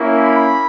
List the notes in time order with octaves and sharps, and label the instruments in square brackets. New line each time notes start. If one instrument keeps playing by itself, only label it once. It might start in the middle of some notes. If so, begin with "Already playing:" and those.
Already playing: [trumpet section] A#3 C#4 E4
B5